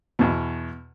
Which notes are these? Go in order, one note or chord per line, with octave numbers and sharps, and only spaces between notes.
E2 B2